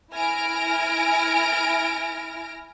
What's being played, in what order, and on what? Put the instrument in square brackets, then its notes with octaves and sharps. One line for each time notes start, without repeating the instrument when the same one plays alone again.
[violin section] E4 G#5 F6 A#6 D7